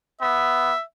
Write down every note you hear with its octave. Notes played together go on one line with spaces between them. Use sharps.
B3 E5